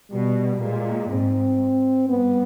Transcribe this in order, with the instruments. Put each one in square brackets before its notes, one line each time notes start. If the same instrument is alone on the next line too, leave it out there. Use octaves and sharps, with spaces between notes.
[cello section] B2 [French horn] G3
[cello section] A#2 [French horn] G#3
[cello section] G#2 [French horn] C4
[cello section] G2 [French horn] B3